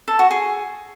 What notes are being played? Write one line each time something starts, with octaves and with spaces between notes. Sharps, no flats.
A4
F#4
G#4